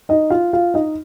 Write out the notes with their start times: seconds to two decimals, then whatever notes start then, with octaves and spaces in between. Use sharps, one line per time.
0.09 D#4 D#5
0.30 F4 F5
0.53 F4 F5
0.74 D#4 D#5